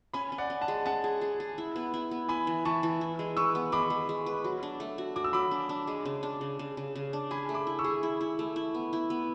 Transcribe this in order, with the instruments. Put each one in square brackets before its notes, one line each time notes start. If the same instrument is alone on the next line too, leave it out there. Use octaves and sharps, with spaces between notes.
[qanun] C#4 [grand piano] G#5 B5
[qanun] C#4
[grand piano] D5 F#5
[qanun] C#4
[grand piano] F#5 A5
[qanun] G#3
[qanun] C#4 [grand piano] F#5 A5
[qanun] G#4
G#4
G#4
E4
B3
E4
B3
[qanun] E4 [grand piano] G#5 B5
[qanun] E3
[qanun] E3 [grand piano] A5 C#6
[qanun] E3
E4
G#3
[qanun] B4 [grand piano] C#6 E6
[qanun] B3
[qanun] G#3 [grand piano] B5 D6
[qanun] G#3
G#3
B4
F#3
D4
A3
F#4
[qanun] F#4 [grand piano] D6
[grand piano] E6
[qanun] F#3 [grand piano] B5 D6
[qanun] D4
D4
G#3
C#3
D4
C#3
C#3
C#3
C#3
D4
[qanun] G#4 [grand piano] G#5 B5
[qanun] A3
[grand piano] B5 D6
[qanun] E4
[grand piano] C#6 E6
[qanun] G#4
E4
E4
A3
E4
B3
E4
B3